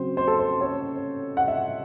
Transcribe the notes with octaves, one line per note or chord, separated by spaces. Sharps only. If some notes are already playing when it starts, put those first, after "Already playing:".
Already playing: C#3 F#3 C4 C5
C5
A4
C5
C#5
F#5
E5